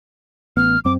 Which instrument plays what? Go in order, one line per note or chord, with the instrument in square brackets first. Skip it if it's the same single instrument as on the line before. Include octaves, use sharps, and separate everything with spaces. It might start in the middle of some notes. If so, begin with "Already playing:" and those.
[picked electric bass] A1 B3 [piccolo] F6
[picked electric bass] F#2 C4 [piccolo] D6